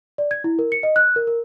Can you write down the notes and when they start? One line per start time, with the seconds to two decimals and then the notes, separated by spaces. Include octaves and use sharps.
0.18 D5
0.31 G#6
0.44 E4
0.59 A#4
0.72 C#7
0.83 D#5
0.96 F#6
1.16 A#4
1.27 A#4